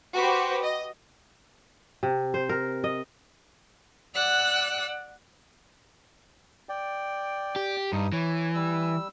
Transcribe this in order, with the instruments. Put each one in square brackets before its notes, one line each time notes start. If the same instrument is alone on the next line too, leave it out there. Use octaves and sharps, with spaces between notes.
[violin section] F#4 G4 B4 C5
D#5
[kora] C3
C5
A#4
D#5
[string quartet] D5 F#5 E6 F#6
[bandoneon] D5 G5
[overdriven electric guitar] G4
[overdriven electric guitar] G2 [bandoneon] D#4 D#6
[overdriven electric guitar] E3 [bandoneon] C#5
[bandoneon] G3 E6